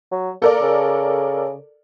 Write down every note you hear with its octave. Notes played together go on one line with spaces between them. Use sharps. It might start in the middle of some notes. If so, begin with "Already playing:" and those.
F#3
A#3 A4 A#4 D5
C#3